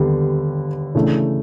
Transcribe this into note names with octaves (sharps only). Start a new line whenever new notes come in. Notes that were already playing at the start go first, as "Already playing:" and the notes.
Already playing: D#2 D3 G3 B3
C#3 E3 A3 D4